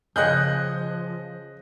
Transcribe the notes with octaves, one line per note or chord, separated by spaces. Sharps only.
C#3 F3 G#4 D#5 F#6 G6